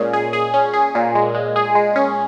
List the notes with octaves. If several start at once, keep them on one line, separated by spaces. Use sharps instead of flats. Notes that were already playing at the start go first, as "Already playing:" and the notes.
Already playing: A#2 G#3 C#4 G#4
G#4
G#4
C#4
G#4
A#2
G#3
G#3
G#4
G#3
C#4